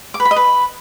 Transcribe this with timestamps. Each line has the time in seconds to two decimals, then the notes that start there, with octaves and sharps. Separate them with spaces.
0.14 D6
0.20 B4
0.25 B5
0.31 D#5
0.36 B4